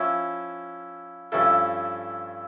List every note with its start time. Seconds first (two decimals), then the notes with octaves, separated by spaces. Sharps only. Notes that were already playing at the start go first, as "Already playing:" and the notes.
Already playing: F3 C#4 E4
1.32 G2 F3 C#4 E4 A4